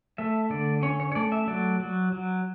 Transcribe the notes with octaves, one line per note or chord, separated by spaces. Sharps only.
A3 E5
D3 D5
C#4 C#5
C#5
C#5
A3 D5
E5
F#3 D5
F#3
F#3